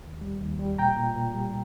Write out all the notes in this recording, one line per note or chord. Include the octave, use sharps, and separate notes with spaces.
D#2
G3
D#2
G3
A#2 G5 A#5
A#2
A#2
G3